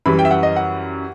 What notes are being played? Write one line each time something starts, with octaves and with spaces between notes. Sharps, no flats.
F#2 E3 G3 B5
G5
E5
F#5
D#5
F#5